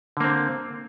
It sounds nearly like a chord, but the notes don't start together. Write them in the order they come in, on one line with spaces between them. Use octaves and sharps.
D3 A#3 C4